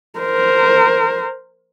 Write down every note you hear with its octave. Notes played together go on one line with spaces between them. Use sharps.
A#4 C5